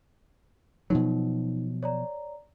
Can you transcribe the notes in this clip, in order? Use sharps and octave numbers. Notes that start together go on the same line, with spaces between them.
B2 F3 F#3 D#4
C#5 D5 A#5